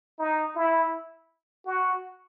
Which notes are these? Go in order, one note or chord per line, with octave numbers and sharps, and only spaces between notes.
D#4
E4
F#4